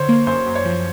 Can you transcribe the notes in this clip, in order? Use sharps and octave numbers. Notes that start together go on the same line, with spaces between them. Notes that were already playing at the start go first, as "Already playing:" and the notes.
Already playing: D3 C5 C#5
A#3
F#2 C5
F#2
C#5
F3